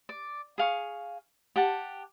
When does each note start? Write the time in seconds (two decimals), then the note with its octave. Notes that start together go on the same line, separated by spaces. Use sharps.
0.09 D5
0.58 G#4 F5 C#6
1.56 G4 F#5 A5